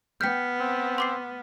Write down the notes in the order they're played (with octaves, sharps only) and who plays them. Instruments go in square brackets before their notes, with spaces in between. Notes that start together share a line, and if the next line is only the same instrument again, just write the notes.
[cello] B3 [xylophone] G5 G6 [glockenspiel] F6 B6 C#7
[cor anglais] C4
[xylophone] C6 D6 C7